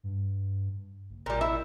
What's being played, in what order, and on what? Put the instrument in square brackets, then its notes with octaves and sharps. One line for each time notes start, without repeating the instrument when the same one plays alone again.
[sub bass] G2
F#1
[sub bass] A1 [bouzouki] A#2 G3
[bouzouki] E4 E5